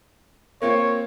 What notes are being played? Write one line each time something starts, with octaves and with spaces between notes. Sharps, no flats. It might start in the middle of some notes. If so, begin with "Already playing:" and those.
A#3 C4 F4 C#5